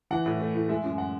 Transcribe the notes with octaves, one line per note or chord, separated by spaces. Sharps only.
E3 F#5
A2
A3
A2
G#3 E5
F#2
F#5